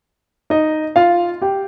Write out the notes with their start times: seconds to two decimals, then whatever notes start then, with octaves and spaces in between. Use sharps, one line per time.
0.50 D#4 D#5
0.96 F4 F5
1.42 G4 G5